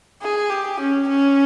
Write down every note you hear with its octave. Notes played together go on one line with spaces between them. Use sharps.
G#4
G4
C#4
C#4